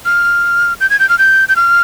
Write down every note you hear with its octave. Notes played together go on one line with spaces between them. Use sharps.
F6
G6
G#6
G6
F6
G6
G6
F6